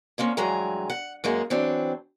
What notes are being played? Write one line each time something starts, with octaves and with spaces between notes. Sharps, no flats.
D3 A#3 C4 C#4
G2 E3 F#3 G#3 G#5 A#5
F#5
F#2 G#3 A#3 G#4
E3 F#3 C4 D4